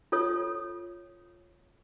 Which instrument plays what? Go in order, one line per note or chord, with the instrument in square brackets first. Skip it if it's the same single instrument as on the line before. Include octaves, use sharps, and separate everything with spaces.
[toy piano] F4 A4 C#5 D#6